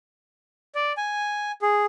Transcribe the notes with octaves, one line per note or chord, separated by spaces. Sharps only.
D5
G#5
G#4